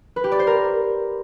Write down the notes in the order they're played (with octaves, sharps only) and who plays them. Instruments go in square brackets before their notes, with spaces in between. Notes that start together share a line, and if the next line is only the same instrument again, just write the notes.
[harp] B4
G4
D5
C5
A#4